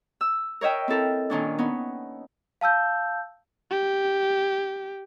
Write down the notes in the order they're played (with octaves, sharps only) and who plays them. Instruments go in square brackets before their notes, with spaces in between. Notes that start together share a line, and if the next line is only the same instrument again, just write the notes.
[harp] E6
A#4 C#5 D#5 E5 G5
C4 E4 A4 A#4
A#2 D#3 C#4 D4
B3 C#4 D#4
[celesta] F5 A5 E6 G6
[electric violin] G4